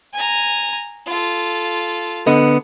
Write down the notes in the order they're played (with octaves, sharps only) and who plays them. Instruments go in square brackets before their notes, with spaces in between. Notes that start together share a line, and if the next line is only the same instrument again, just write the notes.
[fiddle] G#5 A#5
F4 A4
[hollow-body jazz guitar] D3 B3 D#5